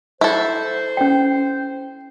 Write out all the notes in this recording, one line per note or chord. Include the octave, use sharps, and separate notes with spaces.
E4 A4 C5
C#4 G5